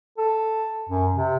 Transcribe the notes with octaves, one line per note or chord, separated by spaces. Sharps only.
A4
F#2
C3